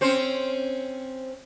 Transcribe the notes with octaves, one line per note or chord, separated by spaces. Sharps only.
C4 C#4 C5